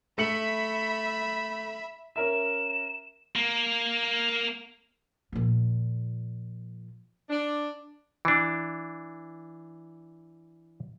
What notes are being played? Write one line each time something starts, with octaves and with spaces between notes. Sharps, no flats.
A3 E5 B5 C#7 F#7
C#4 A#4 E5 E7
A#3
A#2 F3
D4
E3 D4